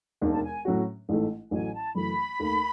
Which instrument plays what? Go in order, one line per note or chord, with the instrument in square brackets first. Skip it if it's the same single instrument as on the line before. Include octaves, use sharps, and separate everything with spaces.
[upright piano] E1 D#2 D#3
[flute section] A5
G#5
[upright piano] A2 F#3 C#4 F#4
A1 G#2 E3 A3
[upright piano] A1 A2 F#3 A3 [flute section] G#5
[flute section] A5
[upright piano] F#1 F#2 E3 A3 [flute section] B5
[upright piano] D#2 D#3 A3